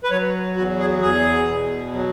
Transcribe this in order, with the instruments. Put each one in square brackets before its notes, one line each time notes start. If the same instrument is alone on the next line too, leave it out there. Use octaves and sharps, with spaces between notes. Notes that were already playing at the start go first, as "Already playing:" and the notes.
[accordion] B4
F#3 C#5
E2 F#4
G#4
E2 G#4
B2
F#3